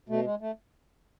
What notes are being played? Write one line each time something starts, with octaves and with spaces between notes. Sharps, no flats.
B2 A3
G#3
A3